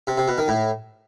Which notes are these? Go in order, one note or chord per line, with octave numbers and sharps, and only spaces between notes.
C3
C3
B2
D#3
A2